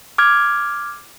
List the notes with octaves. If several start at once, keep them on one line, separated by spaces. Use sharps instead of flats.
D6 F6 G#6